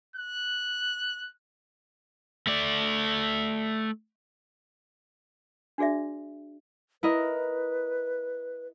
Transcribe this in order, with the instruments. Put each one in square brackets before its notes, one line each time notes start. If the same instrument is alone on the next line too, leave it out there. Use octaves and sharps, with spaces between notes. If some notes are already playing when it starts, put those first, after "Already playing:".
[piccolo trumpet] F#6
[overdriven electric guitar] A3 D5
[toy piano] D4 F#4 G#4 D5 E5
[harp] E4 A#4 D#5 [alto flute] B4